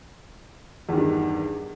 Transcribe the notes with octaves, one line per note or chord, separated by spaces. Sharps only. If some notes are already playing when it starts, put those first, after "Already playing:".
E2 G2 D#3